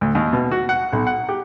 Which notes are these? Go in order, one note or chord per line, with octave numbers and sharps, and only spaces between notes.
D2
D#2
B2
F#4
F#5
B1
F#5
G4